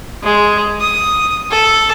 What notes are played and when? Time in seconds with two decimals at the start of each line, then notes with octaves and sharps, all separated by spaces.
0.23 G#3
0.81 D#6
1.51 A4